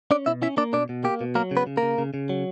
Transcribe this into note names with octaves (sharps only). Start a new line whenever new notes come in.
C#4 D4 D5
B2 E4 E5
C#4 E4 E5
A#3 D4 D5
B2 D4 D5
B2
A#3 G4
B2
F#3 A#3 A#4
C#3
B3 B4
C#3
A#3 A#4
C#3
C#3
C#3
F#3